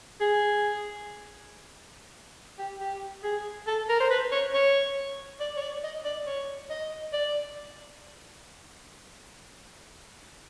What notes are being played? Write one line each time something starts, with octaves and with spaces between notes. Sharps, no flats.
G#4
G4
G4
G#4
A4
A#4
C5
B4
C#5
C#5
D5
C#5
D5
D#5
D5
C#5
D#5
D5